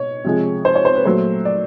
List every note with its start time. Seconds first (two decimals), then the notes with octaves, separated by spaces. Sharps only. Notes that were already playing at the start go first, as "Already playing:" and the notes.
Already playing: B2 C#5
0.24 C3 F3 G#3
0.65 C5
0.75 C#5
0.85 C5
0.95 B4
1.05 A#2 F#3 A3 C5
1.45 D5